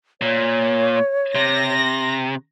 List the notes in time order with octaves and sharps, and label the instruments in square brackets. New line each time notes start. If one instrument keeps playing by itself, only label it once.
[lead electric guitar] A#2 [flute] C#5
[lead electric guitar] C3 [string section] A#6